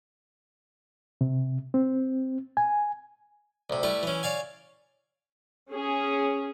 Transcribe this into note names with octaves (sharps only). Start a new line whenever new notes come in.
C3
C4
G#5
D2 C3
G3 A3 E4 B4
E3 C#4
C#5 D5 F5 G#5
C#4 G#4